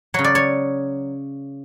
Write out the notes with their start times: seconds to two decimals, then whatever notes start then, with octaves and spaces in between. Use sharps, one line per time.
0.14 C#3 F#3 C#5
0.24 D5
0.35 C#5